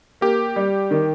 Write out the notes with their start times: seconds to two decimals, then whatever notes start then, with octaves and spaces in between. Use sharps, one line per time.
0.21 A#3 G4
0.56 G3
0.91 D#3